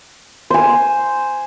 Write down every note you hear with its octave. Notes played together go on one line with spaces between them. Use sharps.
C5 G#5